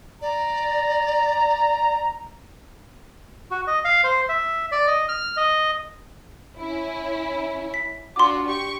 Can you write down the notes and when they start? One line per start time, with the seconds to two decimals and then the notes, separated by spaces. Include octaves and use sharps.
0.22 D5 A#5
3.51 F#4
3.67 D#5
3.85 F5
4.04 C5
4.29 E5
4.72 D5
4.87 D#5
5.08 F6
5.37 D#5
6.57 C#4 E4
7.74 B6
8.16 D4 F4 F#4 C6 D6
8.47 G4 C#6